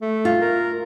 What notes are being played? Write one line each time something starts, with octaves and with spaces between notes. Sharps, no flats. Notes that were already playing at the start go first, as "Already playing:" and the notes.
A3
F4
A#4